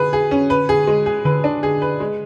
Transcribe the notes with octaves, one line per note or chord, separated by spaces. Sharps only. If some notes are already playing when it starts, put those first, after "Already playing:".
Already playing: D3 G#4 B4
G#4
C#4
B4
G#4
G#3
G#4
D3 B4
D4
G#4
B4
G#3